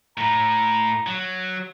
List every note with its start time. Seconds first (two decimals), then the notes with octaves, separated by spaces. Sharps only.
0.18 A2 A#5
1.07 F#3